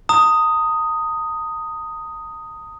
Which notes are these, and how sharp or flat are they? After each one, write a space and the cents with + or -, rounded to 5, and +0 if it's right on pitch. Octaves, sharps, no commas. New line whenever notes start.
A#5 -40 D#6 +0